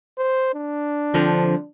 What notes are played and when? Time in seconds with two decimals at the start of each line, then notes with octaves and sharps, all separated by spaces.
0.18 C5
0.55 D4
1.14 D3 F3 C4